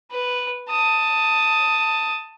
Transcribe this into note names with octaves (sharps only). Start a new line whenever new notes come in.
B4
A5 D#6